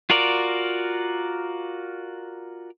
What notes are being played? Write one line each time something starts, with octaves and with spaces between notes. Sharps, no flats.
F4 F#4 A#4 D5